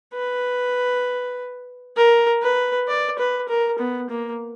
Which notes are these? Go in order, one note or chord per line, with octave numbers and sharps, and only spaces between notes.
B4
A#4
B4
D5
B4
A#4
B3
A#3